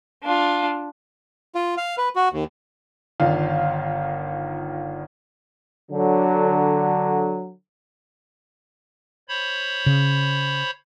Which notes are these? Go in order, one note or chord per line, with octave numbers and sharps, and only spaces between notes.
D4 F4
F4
F5
B4
F#4
D#2
G1 D#3 D4 F4 F5
D3 F#3
C5 C#5 B5
C#3